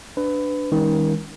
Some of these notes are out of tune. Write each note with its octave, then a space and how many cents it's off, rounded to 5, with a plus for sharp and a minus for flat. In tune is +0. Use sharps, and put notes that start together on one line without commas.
D4 +0 B4 +20
D#3 +20 G#3 -45 C#4 +0